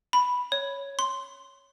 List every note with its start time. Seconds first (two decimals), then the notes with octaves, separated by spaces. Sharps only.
0.13 B5
0.52 C#5
0.99 C6